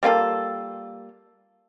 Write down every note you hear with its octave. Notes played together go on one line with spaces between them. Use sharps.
G3 A#3 F4 A4